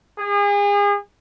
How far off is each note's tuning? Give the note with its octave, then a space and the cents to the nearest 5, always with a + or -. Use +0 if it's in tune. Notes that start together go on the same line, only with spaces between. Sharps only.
G#4 -35